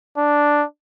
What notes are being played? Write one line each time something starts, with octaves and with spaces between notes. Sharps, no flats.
D4